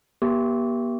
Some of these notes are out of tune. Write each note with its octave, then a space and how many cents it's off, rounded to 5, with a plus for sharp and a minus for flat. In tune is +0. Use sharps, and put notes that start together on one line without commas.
A#3 +45 G4 -5 D6 -35